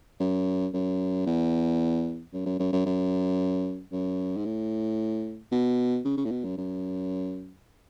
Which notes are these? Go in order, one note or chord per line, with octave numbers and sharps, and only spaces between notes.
F#2
F#2
E2
F#2
F#2
F#2
F#2
F#2
F#2
G#2
A2
B2
C#3
C#3
A2
B2
F#2
F#2